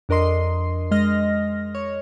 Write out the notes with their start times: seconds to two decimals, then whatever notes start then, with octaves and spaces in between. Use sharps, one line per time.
0.09 F2 D4 A#4 D#5 C6 C7
0.91 G#3 D#5 F6 A#6
1.75 C#5